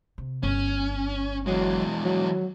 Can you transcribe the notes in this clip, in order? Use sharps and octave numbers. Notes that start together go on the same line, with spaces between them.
C3
G1 C#4
E3 F#3 G#3
F3
F#3